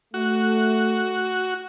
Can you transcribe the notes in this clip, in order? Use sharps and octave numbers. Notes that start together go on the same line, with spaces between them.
A3 F#4